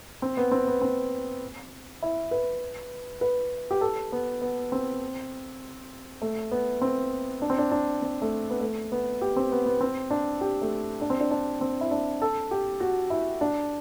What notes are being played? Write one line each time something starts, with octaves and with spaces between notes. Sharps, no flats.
C4
B3
C4
B3
C4
E4
B4
B4
G4
A4
B3
B3
C4
A3
B3
C4
D4
C4
D4
D4
C4
A3
B3
A3
B3
G4
C4
B3
B3
C4
D4
G4
A3
D4
C4
D4
D4
C4
E4
D4
A4
G4
F#4
E4
D4